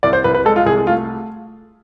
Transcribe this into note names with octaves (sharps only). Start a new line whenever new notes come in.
C2 D5
C5
C2 B4
B4
G#3 A4
F4
C2 G#4
G#4
A3 F4